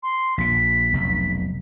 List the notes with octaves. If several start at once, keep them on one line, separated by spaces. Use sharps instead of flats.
C6
A#1 A#2 B6
F1 B1